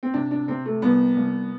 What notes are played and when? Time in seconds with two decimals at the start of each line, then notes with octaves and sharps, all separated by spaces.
0.03 C4
0.14 C3 D4
0.31 D4
0.48 C3 C4
0.66 A3
0.82 C2 B3
1.17 C2